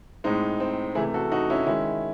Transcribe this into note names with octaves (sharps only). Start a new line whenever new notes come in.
A2 G#3 C4 D#4
C4
C3 E3 A3 E4 G#4
F#4 A4
D#4 F#4
C#4 E4
D#3 G#3 C#4 E4